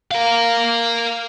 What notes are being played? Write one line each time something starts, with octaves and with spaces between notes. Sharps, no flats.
A#4 F5